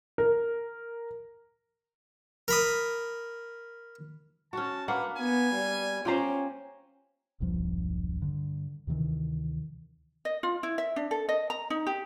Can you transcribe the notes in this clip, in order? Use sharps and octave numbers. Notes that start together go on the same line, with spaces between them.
A#4
A#4 B5 D#6
C#4 F#4 A5
A#3 D4 B4 F#5
B3 G#5
G3
C#4 F4 G4 C5 D5 G5 A#5
D#1 B1 G2 F3
G2 D3
D2 C3 D#3 E3
D#5
F4
E4
E5
D4
A4
D#5
A#5
D#4
G4